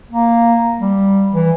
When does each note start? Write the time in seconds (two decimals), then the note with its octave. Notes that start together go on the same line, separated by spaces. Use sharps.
0.11 A#3
0.79 G3
1.33 E3